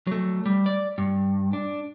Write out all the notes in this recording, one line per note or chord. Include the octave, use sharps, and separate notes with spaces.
F#3 A3
G3
D5
G2
D4